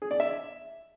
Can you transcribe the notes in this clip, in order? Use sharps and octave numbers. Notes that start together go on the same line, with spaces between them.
G#4
D5
E5